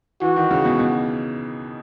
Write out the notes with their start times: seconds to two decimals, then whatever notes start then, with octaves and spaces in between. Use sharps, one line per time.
0.21 E3 F#4
0.36 D#3
0.51 C#3
0.65 B2
0.79 B2